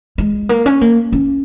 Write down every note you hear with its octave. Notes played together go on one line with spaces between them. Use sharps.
G#3
A#3
C#4
A#3
C#4